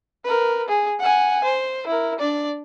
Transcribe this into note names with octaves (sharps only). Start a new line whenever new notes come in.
A#4 B4
G#4
F#5 G#5
C5
E4 A#4
D4 D5